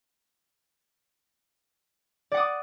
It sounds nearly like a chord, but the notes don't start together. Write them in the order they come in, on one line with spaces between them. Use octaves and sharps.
D5 F#5 D#6 D6